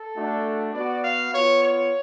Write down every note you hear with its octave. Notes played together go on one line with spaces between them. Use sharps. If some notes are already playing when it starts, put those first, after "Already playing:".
Already playing: A4
A3 D4 F#4
B3 F#4 D5
F5
B3 F4 C#5
C#5